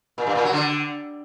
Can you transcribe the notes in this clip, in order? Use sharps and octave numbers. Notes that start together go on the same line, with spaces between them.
A#2
G2
A#2
F#3
D3